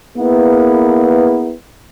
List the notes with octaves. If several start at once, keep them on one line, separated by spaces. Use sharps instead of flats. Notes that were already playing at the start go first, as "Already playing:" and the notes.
A#3 B3 E4 G#4 A#4 B4